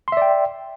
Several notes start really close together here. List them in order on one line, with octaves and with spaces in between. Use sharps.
C6 E5 D5 G5